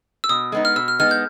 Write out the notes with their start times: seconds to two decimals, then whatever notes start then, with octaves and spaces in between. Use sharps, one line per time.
0.24 E6
0.29 B2 D#6
0.52 G#3 B3 D#4
0.65 F6
0.76 B2 E6
0.88 F6
0.99 G#3 B3 D#4 F6
1.11 G6